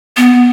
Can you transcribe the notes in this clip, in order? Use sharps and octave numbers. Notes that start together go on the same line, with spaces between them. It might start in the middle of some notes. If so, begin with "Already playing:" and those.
B3